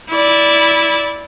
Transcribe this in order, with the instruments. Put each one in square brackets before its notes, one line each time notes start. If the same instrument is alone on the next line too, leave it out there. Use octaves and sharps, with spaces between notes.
[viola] E4 D5